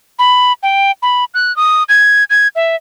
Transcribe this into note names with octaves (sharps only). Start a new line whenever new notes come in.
B5
G5
B5
F#6
D#6
G#6
G#6
E5